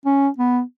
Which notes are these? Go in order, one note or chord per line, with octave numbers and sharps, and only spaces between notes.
C#4
B3